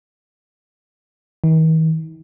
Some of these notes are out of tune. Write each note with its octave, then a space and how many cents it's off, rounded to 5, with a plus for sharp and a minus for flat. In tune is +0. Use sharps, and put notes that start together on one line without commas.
D#3 +45